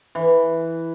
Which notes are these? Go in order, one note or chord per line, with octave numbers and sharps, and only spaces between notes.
E3